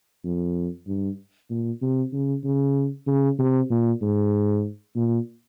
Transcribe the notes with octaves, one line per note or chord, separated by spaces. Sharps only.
F2
G2
A#2
C3
C#3
C#3
C#3
C3
A#2
G#2
A#2